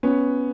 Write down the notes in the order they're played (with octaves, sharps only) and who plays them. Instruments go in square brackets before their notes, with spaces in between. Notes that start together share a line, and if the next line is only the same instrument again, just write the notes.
[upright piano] B3 C#4